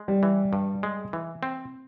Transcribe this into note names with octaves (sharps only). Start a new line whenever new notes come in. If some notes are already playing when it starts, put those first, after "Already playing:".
Already playing: G#3
G3
E3
G2
G#3
E3
C4